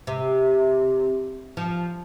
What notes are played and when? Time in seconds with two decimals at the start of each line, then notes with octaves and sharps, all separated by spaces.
0.07 C3
1.57 F3